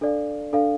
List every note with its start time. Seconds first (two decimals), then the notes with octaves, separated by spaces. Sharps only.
0.01 D4 A4 D5 F5
0.53 D4 A4 D5 F5